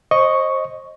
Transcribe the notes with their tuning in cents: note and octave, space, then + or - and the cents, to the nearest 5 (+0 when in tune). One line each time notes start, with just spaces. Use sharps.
C5 +25 D#5 +0 C#6 +0